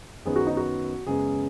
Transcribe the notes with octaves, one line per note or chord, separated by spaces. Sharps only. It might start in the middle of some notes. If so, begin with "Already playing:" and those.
F#2 D#3 B3 G#4
F#4
D#4
F#4
F#2 C#3 G#3 B3 G#4